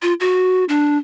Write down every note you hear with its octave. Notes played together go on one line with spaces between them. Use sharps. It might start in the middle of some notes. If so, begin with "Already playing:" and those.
F4
F#4
D4